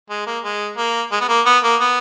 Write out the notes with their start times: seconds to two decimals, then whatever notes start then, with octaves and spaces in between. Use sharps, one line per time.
0.10 G#3
0.27 A#3
0.43 G#3
0.77 A#3
1.12 G#3
1.20 B3
1.29 A#3
1.46 B3
1.63 A#3
1.80 B3